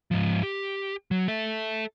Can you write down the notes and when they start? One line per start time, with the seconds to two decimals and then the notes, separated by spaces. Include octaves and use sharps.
0.11 G#2 F3
0.43 G4
1.11 F#3
1.28 A4 E5